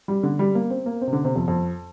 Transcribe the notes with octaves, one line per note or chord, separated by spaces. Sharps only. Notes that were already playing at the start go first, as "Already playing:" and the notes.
G3
D3
G3
A#3
C4
A#3
C4
C3
D3
C3
F2
F2